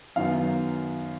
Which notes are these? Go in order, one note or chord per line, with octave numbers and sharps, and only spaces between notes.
F#2 D#3 F#3 B3 F5